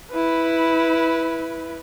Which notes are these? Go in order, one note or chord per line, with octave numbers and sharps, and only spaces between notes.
E4 B4